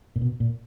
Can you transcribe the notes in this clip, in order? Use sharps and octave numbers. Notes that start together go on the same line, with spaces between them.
A#2
B2
A#2